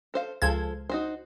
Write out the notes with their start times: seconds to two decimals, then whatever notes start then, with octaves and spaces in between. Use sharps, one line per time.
0.14 A4 C5 F5
0.42 C#2 F3 A4 C5 G#6
0.89 D#4 F#4 C5